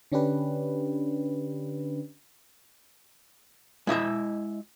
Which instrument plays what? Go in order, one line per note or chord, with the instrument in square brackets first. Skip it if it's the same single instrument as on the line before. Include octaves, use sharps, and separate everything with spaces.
[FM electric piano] D3 C#4 D4 G4 B4
[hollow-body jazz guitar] G#3 E4 D#5 E5